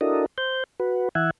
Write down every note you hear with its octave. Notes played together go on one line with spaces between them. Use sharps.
D4 E4 F#4 A4 A#4 D#5
C5 G6
F#4 B4
E3 E5 F#5 G#5